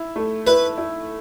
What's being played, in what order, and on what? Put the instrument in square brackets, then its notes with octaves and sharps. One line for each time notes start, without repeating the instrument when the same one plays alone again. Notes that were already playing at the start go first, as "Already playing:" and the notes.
Already playing: [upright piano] E4
A3
[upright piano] E4 [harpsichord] B4
[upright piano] E4